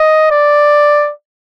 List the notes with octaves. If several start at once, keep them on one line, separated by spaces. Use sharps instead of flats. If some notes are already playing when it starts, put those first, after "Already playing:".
Already playing: D#5
D5